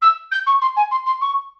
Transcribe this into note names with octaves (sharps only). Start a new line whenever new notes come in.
E6
G6
C#6
C6
G#5
C6
C6
C#6